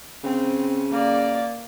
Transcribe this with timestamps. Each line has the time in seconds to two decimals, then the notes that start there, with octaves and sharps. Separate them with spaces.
0.24 C#3 C4
0.90 A#3 D5